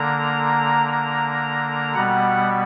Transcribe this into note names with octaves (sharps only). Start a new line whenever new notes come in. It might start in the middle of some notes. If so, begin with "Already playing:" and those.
Already playing: D3 A#3 A#5
A#5
B2 G3 B3 F#5